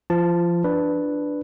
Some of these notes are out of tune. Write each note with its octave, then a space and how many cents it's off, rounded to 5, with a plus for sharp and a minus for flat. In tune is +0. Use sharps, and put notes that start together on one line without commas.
F3 -25 A5 +0
D4 +0 B4 +0